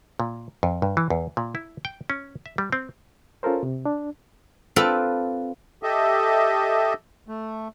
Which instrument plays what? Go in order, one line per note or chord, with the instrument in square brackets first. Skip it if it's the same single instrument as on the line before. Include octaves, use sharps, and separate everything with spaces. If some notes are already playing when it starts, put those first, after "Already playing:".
[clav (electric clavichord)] A#2
F2
G2
E3
E2
A#2
E4
G5
C#4
E5
G3
C4
[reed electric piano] C#4 F4 A4 A#4 C5
C3
D4
[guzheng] C4 F4 A4 B4 D5
[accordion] G4 A4 D#5 E5
A3